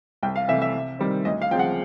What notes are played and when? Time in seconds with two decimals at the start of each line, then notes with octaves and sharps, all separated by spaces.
0.23 C2 G5
0.36 F5
0.48 C3 E3 A3 E5
0.62 E5
0.73 C3
0.99 D#3 G3 C4
1.25 D2 D#5
1.42 F5
1.51 C#3 F3 G#3 C4 G5
1.59 F#5